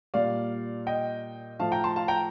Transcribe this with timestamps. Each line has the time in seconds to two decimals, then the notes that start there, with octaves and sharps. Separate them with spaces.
0.14 A#2 G3 D5 F5
0.87 D#5 G5
1.60 A2 F3 F5 A5
1.72 G5 A#5
1.84 A5 C6
1.96 F5 A5
2.08 G5 A#5